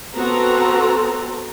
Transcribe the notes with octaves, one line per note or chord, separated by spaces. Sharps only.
B3 C4 F#4 A4 A#5